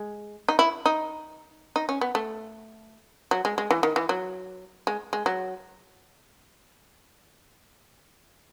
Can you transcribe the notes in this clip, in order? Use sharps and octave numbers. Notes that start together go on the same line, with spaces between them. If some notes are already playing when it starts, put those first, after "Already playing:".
Already playing: G#3
D#4
E4
D#4
D#4
C#4
B3
A3
F#3
G#3
G#3
E3
D#3
E3
F#3
G#3
G#3
F#3